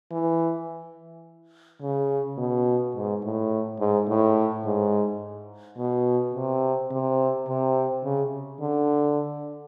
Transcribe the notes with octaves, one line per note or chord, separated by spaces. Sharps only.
E3
C#3
B2
G#2
A2
G#2
A2
G#2
B2
C3
C3
C3
C#3
D3